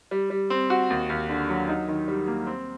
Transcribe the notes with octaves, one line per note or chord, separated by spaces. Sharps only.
G3
G3
C4
F#4
D#2
D#2
D3
F#3
D#4
D#3
G3
A#3
C4